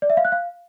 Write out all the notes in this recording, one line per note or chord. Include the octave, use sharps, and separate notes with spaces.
D5
E5
F5
F#6
F5